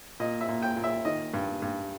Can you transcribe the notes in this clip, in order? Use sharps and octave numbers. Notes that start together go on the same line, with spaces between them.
A#2 D#5
E5
A#2
G5
A#2
E5
D#3 D#5
G2
G2